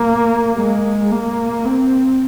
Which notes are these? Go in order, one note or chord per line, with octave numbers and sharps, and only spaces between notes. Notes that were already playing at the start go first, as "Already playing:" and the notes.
Already playing: A#3
G#3
A#3
C4